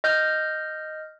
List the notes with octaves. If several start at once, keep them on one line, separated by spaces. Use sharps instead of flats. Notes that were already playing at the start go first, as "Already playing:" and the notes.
D#5 F6 G6